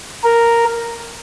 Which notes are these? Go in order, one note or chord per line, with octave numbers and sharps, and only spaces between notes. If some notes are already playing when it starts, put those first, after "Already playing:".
A#4